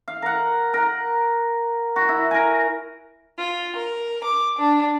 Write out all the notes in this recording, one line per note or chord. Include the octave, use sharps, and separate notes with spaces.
F5
A#4 F#5
A#4 F#5
F#4
E4
A#4 G#5
F4
A#4
D6
D4